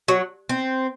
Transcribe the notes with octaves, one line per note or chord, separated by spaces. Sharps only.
F#3
C4